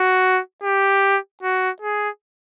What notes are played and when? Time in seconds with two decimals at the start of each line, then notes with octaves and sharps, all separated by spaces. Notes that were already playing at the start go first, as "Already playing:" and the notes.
Already playing: F#4
0.63 G4
1.43 F#4
1.82 G#4